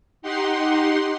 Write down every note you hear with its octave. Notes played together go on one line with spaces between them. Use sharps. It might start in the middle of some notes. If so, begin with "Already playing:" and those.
D#4 G4 F#5 C6